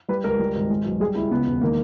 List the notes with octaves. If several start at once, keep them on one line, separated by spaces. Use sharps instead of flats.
G3 B4
C#2 A#4
G3
G#1
G#3
B1
G3 G#4
C#2 E4
C#3 B3
E1
D#3 A#3